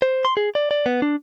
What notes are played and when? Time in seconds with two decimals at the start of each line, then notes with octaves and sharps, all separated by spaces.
0.02 C5
0.25 C6
0.37 G#4
0.55 D5
0.71 D5
0.86 B3
1.02 D4